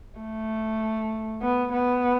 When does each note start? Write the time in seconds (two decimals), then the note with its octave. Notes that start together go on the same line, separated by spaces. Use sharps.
0.20 A3
1.42 B3
1.73 B3